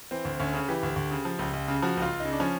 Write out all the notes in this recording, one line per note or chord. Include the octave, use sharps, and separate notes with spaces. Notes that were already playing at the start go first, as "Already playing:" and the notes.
E3 C4
D2
D2 C#4
C#3
E3 G4
D2
D2
C#3
F3
C#2
C#2
C#3
F3 F#4
C#2 F4
C#2
C#3 D#4
D4
F3 C#4